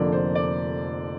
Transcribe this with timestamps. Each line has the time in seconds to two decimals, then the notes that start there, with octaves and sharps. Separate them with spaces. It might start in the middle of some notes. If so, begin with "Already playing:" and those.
Already playing: F1 F2 D3 F3 A#3 D5
0.12 C5
0.35 D5